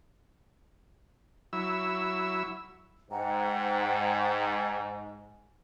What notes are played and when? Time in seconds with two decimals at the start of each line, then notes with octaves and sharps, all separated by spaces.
1.53 F#3 E4 E6
3.10 G#2 F#5 G5 A#5